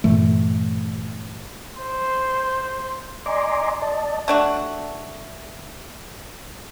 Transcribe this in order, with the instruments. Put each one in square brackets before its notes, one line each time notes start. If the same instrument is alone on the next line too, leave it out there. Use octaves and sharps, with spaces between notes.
[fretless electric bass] G2 A#2 E3 A3
[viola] C5
[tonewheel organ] D5 D#5 G#5 A#5 C6 D6
D5 D#5 A5
[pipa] A3 D4 F#4